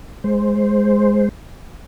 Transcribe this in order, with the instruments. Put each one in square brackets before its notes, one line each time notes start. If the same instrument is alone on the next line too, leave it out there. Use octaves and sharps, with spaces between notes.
[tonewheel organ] G#3 C5